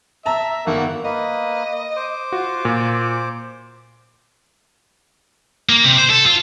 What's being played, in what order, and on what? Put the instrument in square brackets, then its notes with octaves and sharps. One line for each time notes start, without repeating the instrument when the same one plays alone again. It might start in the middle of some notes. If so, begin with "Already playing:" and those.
[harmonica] E5 [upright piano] A5 A#5
[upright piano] G1 D#3 [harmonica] A#3 F#4 F#5
[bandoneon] A#3 B4 [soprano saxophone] D#5
[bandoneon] C5 D6
[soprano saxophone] F4 [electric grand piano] F#4
[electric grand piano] A#2
[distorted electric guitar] A#3
C3
C5
A4
F4